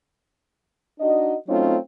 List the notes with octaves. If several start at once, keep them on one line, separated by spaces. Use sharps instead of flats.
D4 D#4 F#4 D#5
F#3 A3 C4 C#4 D#4 F4